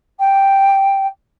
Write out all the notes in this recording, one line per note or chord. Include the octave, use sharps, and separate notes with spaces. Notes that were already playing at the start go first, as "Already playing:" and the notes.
G5